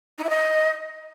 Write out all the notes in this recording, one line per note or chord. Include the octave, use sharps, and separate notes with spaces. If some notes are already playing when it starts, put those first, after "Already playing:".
D#4
E4
D#5